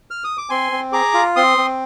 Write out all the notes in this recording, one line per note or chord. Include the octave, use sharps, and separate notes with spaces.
F6
D#6
D6
C4 G#5 C6
C4
G#4 A#5 D6
F4
C4 C6 D#6
C4